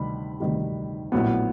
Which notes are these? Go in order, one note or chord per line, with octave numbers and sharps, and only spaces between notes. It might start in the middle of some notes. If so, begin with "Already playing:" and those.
Already playing: D2 C3 D#3 G3 B5
D2 C3 D#3 G3
A#1 A2 F#3 B3